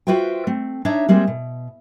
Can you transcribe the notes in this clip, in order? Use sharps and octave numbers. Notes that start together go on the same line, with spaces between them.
F4 F#4 B4 C5 E5 G5
A3 C4
D4 D#4 C#5 E5
G3 G#3 A#3 C4 G#4
B2